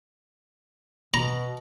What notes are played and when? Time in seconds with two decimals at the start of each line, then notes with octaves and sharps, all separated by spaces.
1.14 B2 A#5